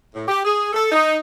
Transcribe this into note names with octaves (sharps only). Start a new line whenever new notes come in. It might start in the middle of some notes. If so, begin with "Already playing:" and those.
A2
G4
G#4
A4
D#4